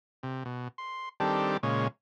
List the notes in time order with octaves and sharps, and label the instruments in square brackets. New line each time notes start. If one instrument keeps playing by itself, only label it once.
[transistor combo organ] C3
B2
C6
D#3 G3 C4 D4 G4 A4
A#2 C#3 G#3 C#5